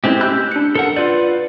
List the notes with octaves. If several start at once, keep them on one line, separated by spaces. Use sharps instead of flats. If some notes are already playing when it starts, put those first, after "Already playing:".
G#3 A3 C4 C#4 E4 G4
G4 B5 E6 F#6 G6
D4 C#7
A4 A#4 F#5
F4 B4 D5 G6